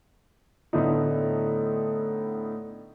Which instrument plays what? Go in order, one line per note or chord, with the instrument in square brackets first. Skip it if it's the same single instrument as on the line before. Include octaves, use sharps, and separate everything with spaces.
[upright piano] A2 D3 A3 B3 D#4